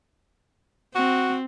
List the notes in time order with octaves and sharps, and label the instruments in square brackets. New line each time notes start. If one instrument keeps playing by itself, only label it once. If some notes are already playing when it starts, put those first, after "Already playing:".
[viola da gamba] C4 [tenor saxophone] F#4